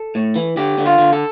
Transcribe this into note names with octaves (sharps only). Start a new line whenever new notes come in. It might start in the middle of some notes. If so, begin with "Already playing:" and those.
Already playing: A4
A2
E3
D3 G4
D3
F4
D3
A4